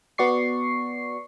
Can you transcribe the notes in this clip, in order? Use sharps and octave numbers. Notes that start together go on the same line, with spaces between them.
B3 F#4 D5 C#6 C7